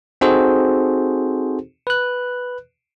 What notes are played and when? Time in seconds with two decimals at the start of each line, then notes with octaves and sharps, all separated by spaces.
0.21 C4 D#4 F#4 G#4 A4 C5
1.87 B4 F#6